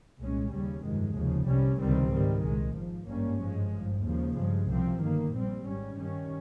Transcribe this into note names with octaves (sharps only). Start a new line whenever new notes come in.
C2 A#2 G#3 C#4
D#2 C#3 G3 C#4
G1 F2 C3 D#3 G#3
F1 D#2 C#3 F3
C2 C3 G3 C#4
C#2 C3 D#3 G3 C4
G#2 D#3 G3
C2 A#2 G#3
G#1 G#2 F3
G#1 G2 G3 A#3 C#4
G#1 G2 F3 G#3
G#1 G2 F3
D#2 C#3 F3
G2 F3 G#3
C2 C3 F3 C4
G1 G2 D#3 A#3
A#1 A#2 G3 C4
G#1 G#2 G3 C#4
G2 D#3 G3 C#4